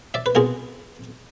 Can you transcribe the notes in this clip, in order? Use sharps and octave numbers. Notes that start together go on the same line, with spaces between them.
D5 E5
B4
C2 B2 G#3 G#4 A#4